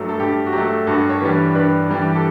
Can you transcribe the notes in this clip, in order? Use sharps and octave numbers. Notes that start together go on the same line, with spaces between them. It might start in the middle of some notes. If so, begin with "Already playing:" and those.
Already playing: G2 F#3 A3
A4
G2 G4
F#4
F#3 A3 G4
G2 F#4 A4
C#5
E3 G3 D4 G4 B4
G2 B4 D5
E3 G3 D4
G4
A4